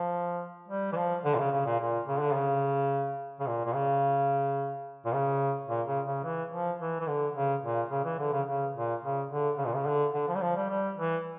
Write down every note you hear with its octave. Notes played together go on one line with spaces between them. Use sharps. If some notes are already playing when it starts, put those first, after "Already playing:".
Already playing: F3
G3
E3
F3
D3
A#2
C#3
C#3
A#2
A#2
C#3
D3
C#3
C#3
A#2
A#2
C#3
A#2
C#3
A#2
C#3
C#3
E3
F3
E3
E3
D3
C#3
A#2
C#3
E3
D3
C#3
C#3
A#2
C#3
D3
C#3
A#2
C#3
D3
D3
F3
G3
F3
G3
G3
E3